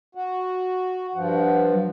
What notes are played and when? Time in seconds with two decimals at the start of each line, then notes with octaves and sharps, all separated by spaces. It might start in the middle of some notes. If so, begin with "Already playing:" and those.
0.15 F#4
1.15 G2 F3 F#5
1.73 F#3